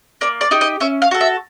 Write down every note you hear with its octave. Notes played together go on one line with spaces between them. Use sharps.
A#3 D5
D5
D#4 G4
D#5
C#4 E5
F5
F#4 A4
E5